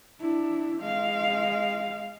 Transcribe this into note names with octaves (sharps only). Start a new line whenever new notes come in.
D4 E4
G#3 F5